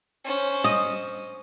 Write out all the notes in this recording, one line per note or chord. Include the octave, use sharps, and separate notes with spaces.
C#4 C5
D#5